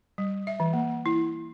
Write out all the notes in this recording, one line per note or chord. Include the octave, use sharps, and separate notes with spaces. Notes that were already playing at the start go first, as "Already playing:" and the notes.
G3
E5
E3
A#3
E4